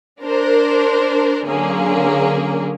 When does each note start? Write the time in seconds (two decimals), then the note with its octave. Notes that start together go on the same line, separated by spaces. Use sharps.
0.22 D4 A#4 C5
1.46 D3 F#3 A#3 C#4 G#4